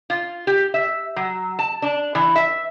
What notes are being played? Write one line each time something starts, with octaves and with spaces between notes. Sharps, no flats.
F4
G4
E5
F#3
A5
D4
E3
E5